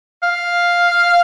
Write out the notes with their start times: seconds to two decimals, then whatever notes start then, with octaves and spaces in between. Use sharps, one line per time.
0.23 F5